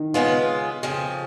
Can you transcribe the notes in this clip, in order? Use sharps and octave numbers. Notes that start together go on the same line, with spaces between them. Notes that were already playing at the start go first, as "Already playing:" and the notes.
Already playing: D#3
C#3 G#3 B3 F4
F2 C#3 F3